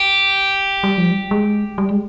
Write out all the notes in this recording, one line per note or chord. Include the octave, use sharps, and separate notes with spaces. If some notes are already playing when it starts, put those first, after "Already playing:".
Already playing: G4
G3
F3
G3
G#3
G3
G#3